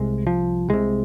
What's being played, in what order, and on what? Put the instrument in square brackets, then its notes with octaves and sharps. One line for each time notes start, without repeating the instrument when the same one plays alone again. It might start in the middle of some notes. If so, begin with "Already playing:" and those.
Already playing: [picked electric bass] C2 C3 G#3
F3
C2 C3 G#3